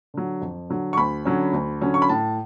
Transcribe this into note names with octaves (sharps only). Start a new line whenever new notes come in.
D3 F#3
F2
D3 F#3
C#6
D2 B5
D3 F#3 C#4
D2
D3 F#3 C#4
C#6
B5
A2 A5